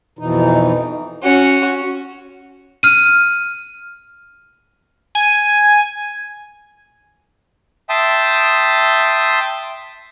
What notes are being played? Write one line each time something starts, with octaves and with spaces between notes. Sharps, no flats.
F2 B2 E3 D#4
C#4 F#4
F6 D#7
G#5
E5 G5 A5 C6 D#6